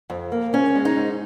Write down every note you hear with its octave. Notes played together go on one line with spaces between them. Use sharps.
F2
A#3
G#2 C#4
G#3
D#4
G#2